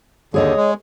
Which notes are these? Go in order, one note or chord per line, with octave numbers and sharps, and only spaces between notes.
D#2 D3 G#4 C#5 D#5
G#3